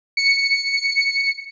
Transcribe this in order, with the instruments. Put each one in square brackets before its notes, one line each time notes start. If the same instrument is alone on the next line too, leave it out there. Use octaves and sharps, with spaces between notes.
[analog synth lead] C#7